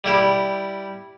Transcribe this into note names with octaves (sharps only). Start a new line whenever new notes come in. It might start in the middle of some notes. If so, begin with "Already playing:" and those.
G3 E4 G4